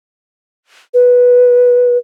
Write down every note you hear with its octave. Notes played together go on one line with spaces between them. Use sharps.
B4